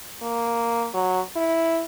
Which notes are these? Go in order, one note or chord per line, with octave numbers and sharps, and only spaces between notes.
A#3
F#3
E4